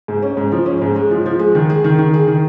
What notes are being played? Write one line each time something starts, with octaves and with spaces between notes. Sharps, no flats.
G#2
C#4
G#2
F3
C#4
G#2
G#3
F3
F3
G#3
D#3
G#4
D#3
D#3
G#4
D#3